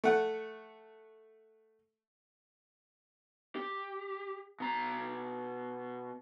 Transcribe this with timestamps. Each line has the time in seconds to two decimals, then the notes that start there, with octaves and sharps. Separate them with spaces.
0.04 A3 F#5
3.56 G4
4.60 B2 A#5